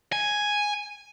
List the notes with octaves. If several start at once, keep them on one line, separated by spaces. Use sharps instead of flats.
G#5